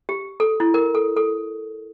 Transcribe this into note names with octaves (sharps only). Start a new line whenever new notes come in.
G4
A4
E4
A#4
A4
A4